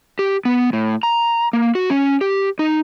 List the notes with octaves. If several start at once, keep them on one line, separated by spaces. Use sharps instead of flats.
G4
B3
A2
A#5
A#3
F#4
C#4
G4
D#4